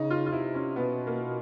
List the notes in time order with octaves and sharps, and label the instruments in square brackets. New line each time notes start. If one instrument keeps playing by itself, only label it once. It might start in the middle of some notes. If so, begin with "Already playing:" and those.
Already playing: [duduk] C#3 [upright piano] D#4
[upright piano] F4
F4
[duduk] C3 [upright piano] E4
[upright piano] C#4
[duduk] B2 [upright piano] B3
[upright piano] A#3